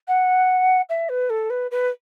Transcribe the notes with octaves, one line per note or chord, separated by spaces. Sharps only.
F#5
E5
B4
A4
B4
B4